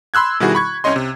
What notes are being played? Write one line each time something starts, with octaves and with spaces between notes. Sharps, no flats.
B5 C6 E6 F#6 G#6
B2 D#3 G3 E4 F#4 G#4
B5 C#6 G#6
C2 C#4 C#5 D#5 C6
C3